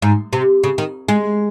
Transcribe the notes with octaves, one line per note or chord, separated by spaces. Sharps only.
G#2
C3
C#3
D#3
G#3